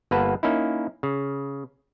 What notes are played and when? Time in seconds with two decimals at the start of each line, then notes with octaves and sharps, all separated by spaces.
0.11 G1 A#3 B4 F#5 A5
0.43 A#3 C#4 D#4 E4
1.03 C#3